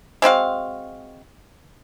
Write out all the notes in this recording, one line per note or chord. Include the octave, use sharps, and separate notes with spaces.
G#3 C4 F#4 F5